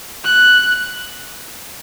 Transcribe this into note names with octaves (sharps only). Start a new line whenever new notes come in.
F#6